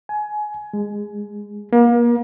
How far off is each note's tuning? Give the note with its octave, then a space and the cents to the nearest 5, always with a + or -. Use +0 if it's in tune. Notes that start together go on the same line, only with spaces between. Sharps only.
G#5 +20
G#3 -15
A#3 +35